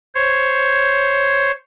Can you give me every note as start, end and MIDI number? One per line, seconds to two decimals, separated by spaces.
0.15 1.51 72
0.15 1.51 73